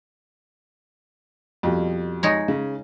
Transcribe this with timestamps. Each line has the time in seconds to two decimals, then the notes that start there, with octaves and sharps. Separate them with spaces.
1.63 F2 B2 G3
2.23 G#3 D#4 C#5
2.48 C#3